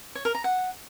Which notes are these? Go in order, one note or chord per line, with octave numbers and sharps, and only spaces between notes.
C#5
A#4
A#5
F#5